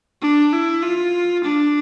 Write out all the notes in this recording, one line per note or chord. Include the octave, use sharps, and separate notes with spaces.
D4
E4
F4
D4